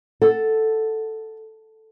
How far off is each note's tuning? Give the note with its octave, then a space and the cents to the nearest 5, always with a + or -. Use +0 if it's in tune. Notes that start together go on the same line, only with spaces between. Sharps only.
A4 +0 F#5 +0